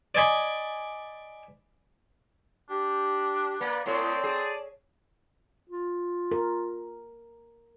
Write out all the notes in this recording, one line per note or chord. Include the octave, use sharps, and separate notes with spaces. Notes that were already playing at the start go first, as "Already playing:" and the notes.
D5 D#5 G#5 B5
D4 G4
A#3 B4 D5
A2 C4 C#5 D5 A5
G#4
F4
A#4